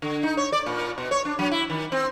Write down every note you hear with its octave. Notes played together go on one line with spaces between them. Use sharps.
D3
D#4
C#5
D5
A#2
B2
C#5
D4
F#3
E4
D#3
C4